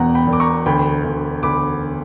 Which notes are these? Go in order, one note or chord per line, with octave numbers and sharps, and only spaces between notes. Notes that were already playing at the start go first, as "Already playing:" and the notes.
Already playing: E1 E2 B2 F#5 G5 A#5
G5 B5
E1
D6
A#5 C#6
D2 G5 B5
D2
D2 B5 D6